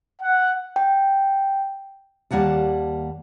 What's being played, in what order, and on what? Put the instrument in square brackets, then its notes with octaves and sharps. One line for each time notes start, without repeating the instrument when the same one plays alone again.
[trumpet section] F#5
[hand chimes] G5
[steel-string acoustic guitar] D#2 G3 A#3 F#5 A5